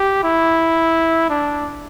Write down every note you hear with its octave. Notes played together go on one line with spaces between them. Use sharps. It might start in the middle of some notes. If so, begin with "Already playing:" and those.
Already playing: G4
E4
D4